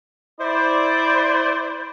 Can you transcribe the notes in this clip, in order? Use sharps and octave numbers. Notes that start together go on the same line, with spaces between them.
E4 C5 D5